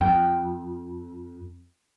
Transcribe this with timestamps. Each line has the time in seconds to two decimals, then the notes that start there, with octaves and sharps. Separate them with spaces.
0.01 F2 G5